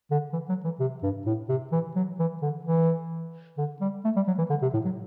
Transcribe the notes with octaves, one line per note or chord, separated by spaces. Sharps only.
D3
E3
F#3
E3
C3
G2
A2
C3
E3
F#3
E3
D3
E3
D3
G3
A3
G3
F#3
E3
D3
C3
A2
F#3